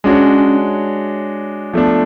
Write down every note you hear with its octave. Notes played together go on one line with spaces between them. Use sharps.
G#3 C#4 D4 F#4 C#5
F3 A3 B3 D4